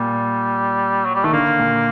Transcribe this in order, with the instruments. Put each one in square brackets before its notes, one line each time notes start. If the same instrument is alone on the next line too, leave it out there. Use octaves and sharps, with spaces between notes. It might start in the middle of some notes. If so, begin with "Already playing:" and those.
Already playing: [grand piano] A#2 [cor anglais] G3
[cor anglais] F#3
G3
[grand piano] D#3 [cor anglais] A3
[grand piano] D3 [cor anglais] A#3
[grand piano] A#2